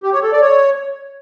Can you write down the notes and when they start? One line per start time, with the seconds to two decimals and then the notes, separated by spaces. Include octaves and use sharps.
0.03 G4
0.13 C#5
0.22 A4
0.32 D5
0.42 C#5